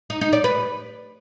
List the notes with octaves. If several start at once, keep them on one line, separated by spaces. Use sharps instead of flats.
D#4
D#4
D5
B4